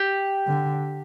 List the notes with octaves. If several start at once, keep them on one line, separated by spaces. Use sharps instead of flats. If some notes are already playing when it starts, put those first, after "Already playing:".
Already playing: G4
D3